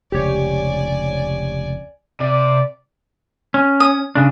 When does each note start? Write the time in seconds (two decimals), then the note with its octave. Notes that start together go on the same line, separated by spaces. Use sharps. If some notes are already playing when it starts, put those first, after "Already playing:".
0.12 F1 C#2 G4 C#5 D5 G#5
2.20 C3 D5
3.54 C#4
3.80 D#6
4.15 C#3 D4